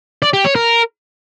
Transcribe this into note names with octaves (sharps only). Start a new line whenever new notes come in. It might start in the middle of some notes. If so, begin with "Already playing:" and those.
D5
G4
C#5
A#4